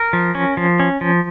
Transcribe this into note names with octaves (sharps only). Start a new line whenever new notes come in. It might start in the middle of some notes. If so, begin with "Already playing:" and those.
Already playing: A#4
F3
C#4
F3
C#4
F3